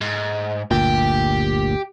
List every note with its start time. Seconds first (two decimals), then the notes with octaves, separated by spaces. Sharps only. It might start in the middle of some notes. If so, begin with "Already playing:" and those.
0.01 G#2
0.71 G1 D2 A#2 G4